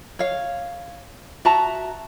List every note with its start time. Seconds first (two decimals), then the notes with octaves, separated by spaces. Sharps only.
0.19 C#5 F5
1.45 F#4 E5 A5 A#5